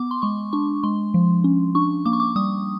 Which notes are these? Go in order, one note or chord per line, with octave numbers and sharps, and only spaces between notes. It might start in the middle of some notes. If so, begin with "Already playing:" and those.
Already playing: B3 D6
C6
G#3 C#6
D4 C#6
G#3 C6
F3
C#4
D4 C#6
A#3 D6
C#6
D6
G3 D#6